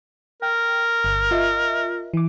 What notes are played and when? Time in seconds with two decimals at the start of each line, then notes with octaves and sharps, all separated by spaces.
0.42 A#4 G5
1.04 G1
1.31 F4 D#5 E5
2.14 E3 D6